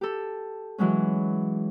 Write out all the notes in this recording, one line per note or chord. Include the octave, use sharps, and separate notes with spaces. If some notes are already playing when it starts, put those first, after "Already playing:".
G4 A4
E3 F#3 G#3 C#4